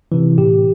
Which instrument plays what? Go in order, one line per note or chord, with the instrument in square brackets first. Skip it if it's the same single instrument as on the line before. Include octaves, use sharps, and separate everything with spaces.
[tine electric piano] C3 E3
A2 G4